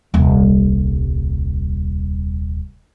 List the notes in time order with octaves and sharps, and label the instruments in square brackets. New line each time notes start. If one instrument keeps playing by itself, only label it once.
[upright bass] D#1 C2